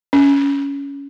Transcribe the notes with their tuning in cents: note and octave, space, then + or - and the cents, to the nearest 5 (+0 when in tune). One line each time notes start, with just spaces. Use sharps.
C#4 +15